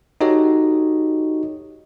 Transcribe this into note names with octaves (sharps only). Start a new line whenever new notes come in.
D#4 F#4 G4 A4 C#5 D#5